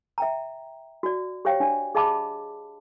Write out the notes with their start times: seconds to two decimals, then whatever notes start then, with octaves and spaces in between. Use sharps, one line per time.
0.18 E5 G5 A#5
1.03 F#4 D5
1.45 G4 C5 C#5 F5 G5
1.60 D4 D5
1.95 G#4 D#5 F5 A5 B5 D6